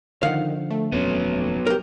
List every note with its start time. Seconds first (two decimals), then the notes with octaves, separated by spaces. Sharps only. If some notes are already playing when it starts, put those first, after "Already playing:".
0.23 D3 D#3 F3 F5 F#5
0.71 A3
0.92 D#1 F2 F#3 B3 C#4
1.67 G4 A#4